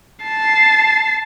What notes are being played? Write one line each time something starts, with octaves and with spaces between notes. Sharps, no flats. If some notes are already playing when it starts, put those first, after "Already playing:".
A5 C7